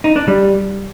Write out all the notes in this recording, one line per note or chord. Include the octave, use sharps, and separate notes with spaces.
D#4
D4
G3